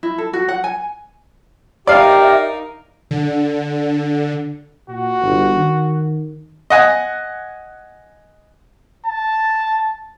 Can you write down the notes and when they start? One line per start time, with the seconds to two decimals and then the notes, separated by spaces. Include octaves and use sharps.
0.03 E4
0.18 A4
0.33 F#4
0.48 F#5
0.64 G#5
1.87 D#4 G4 A#4 D5 E5 F5
3.11 D3
4.89 A#2 F#4
5.23 G1
5.55 D#3
6.70 D#5 F#5 G#5
9.06 A5